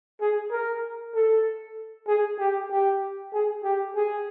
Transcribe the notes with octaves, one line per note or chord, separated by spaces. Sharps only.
G#4
A#4
A4
G#4
G4
G4
G#4
G4
G#4